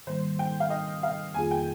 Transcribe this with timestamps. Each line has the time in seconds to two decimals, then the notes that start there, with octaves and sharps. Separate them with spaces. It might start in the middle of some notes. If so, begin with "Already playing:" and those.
0.07 G#2 D#3 G3 A#3 C5
0.39 G5
0.60 F5
0.70 D#5
1.03 F5
1.34 F2 D#3 A#3 F4 G#4 G#5
1.51 G5